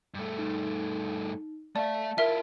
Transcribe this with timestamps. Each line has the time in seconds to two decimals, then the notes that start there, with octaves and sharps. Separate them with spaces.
0.14 G2 A3
0.39 D#4
1.76 A3 D5 E5 F5 A5
2.18 E4 F4 A#4 E5